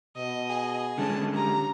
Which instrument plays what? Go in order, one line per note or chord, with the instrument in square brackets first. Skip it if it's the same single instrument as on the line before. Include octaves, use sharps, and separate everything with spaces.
[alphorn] B2 [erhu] D#5
[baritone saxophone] G#4
[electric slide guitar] D3 G#3 C#4 [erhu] A5
[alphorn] G4 [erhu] A#5